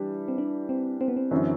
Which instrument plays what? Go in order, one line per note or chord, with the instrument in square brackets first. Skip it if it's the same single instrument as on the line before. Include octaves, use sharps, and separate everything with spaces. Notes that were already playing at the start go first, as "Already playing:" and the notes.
Already playing: [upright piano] E3 G3 D4 G4
[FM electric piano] C4
D4
C4
C4
B3
C4
[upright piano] F#2 D3 F#3 C4 E4 [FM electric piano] E3